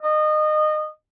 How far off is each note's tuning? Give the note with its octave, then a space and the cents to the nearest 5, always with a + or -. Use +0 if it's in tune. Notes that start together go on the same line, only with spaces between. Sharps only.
D#5 -25